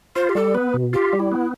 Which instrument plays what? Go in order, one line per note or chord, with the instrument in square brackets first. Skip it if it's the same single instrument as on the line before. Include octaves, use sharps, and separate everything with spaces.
[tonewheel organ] F4 [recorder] C5
[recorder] G4
[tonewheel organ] G3 [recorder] A4
[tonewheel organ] B3 [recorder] B4
[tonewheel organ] B2
[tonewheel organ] F4 [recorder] G4
[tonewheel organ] G3
[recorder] E4
[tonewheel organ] B3